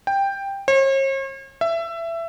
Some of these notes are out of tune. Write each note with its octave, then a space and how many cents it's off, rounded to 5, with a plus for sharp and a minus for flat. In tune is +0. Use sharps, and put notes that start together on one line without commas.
G5 +10
C#5 -45
E5 +20